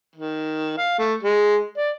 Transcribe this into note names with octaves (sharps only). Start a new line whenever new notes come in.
D#3
F5
A3
G#3
D5